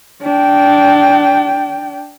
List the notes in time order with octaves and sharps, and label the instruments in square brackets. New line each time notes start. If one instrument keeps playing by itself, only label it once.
[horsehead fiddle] D4 G5